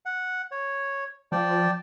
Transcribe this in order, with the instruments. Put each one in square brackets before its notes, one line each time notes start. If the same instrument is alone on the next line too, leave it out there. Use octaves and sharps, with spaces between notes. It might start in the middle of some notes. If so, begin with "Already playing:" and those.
[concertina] F#5
C#5
[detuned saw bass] F3 [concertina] D5 G5 A5